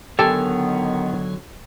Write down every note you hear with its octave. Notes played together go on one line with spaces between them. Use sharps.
D3 D#3 F#3 B3 G4 A4 G#5 A5